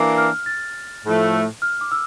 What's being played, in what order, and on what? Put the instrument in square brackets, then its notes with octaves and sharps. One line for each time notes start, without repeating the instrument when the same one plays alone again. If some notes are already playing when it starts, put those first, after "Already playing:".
Already playing: [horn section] E3 A#3 D4
[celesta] F6
A6
[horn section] A2 F3 A3
[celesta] F6
D6
E6